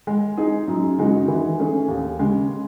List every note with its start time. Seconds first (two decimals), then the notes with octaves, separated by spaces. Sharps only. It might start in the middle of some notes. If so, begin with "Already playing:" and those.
0.07 G#3
0.37 D#4 G#4
0.68 F#2
0.98 C#3 G#3 D#4 F#4
1.28 E3
1.59 A3 C#4 G#4
1.88 D#2
2.19 C#3 G#3